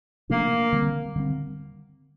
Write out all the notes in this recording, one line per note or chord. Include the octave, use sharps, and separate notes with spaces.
C3 F3 A3 A#3 D4
D3 G3 C4
D3 G3 C4